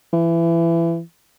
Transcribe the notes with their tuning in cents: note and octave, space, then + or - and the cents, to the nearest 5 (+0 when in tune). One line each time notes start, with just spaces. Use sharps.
E3 +25